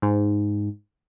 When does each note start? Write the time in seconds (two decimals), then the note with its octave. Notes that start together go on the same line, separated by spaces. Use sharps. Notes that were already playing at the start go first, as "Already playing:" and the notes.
0.02 G#2